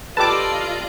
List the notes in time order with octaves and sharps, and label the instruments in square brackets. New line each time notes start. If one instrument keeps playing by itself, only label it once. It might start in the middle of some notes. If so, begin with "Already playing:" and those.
[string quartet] F4 D5 D#5 [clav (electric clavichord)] G4 A4 B4 [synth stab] A5 D6